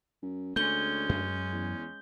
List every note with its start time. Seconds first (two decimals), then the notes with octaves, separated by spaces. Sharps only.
0.23 F#2
0.56 D2 G#3 A3 C#4 G6 G7
1.09 F#2
1.52 E2